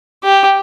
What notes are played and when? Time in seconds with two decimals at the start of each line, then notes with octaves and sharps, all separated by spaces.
0.24 G4